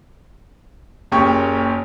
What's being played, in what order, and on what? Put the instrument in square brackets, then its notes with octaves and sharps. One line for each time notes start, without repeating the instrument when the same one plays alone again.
[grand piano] F#1 A#2 C#3 G4 C#6